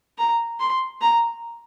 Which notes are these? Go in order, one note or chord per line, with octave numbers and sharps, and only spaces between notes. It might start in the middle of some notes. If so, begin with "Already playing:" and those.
A#5
C6
A#5